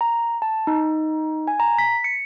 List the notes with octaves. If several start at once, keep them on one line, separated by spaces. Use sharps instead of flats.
A#5
A5
D#4
G#5
A#5
B6
C#7